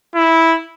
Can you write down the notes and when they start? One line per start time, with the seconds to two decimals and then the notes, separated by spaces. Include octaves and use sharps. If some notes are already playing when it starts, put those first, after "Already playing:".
0.15 E4